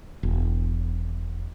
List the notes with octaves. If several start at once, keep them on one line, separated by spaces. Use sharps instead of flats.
E1